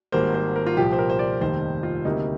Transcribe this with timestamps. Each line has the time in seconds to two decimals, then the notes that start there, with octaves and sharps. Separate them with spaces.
0.12 G#1 G#2 G3 A#3 C5
0.34 C5
0.56 A#4
0.66 F4
0.77 C2 A#2 F3 G4
0.93 C5
0.99 A#4
1.10 C5
1.19 D5
1.41 F1 D#2 D#3 G3 C5
1.83 F4
2.05 D2 C3 G3 A#3 D#4